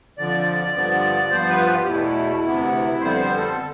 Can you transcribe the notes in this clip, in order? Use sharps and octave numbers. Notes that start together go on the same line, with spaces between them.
F2 D3 F3 D5
G2 D3 F3 B3
G2 F3 B3 C5
B4
F4
G4
E2 B2 A3 E4
D2 C3 E3 B3
F2 D3 G3 B3 C5
C5
A4
D3